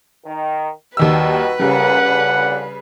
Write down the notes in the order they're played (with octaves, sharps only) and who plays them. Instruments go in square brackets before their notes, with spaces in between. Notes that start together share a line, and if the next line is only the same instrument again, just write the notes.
[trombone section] D#3
[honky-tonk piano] D#2 D#3 E6 [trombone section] G3 D#4 F#4 [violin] B4
[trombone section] A1 F#2 A#2 [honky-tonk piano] C#3 G3 [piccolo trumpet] F#5
[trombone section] A1 A#2 D3